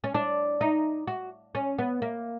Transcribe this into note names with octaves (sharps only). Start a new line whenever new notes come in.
C#4
D4
D#4
F#4
C#4
B3
A#3